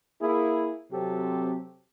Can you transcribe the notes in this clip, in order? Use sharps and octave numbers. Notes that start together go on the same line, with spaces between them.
A#3 E4 G#4
C3 F#3 C4 F#4 G4 A4